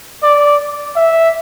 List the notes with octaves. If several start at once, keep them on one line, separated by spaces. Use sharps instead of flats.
D5
E5